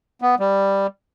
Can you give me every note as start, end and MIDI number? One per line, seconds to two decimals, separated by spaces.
0.22 0.35 59
0.40 0.87 55